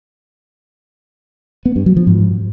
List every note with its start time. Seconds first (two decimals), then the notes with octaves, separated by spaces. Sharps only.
1.65 B3
1.76 G2
1.86 F#3
1.97 F3
2.07 G#2